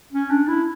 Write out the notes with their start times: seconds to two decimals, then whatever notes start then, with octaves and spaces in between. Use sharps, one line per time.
0.13 C#4
0.30 D4
0.48 E4